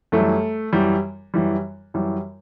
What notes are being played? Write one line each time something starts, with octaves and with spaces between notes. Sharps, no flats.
F#2 E3 G3 A3
F#2 E3 G3
F#2 E3 G3
F#2 E3 G3